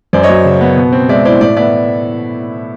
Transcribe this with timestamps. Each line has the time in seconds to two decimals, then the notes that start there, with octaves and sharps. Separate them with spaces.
0.13 F#2 C5 D5
0.23 C#5 D#5
0.30 F#3
0.45 C#3
0.61 B3
0.77 B2
0.93 C4
1.09 G#3 D5 E5
1.25 E4 C5 D5
1.41 A2 D5 E5
1.57 B3 D5 E5